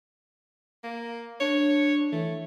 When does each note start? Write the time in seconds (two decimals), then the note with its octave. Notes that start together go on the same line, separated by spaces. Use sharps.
0.84 A#3
1.40 D4 C#5
2.12 E3 A3